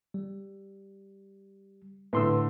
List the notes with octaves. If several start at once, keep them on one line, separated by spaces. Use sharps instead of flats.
G3
A2 D3 B4 C6 E6